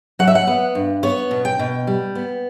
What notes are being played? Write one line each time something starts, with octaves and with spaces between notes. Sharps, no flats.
F#3 F#5
E5
F#5
B3
G2
B3 C#5
B2
G5
B2
G3
B3